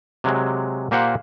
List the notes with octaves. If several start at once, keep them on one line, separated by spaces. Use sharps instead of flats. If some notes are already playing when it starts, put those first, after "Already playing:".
C3 F#3 G#3
A#2 A#3 G4 C5 F5 F#5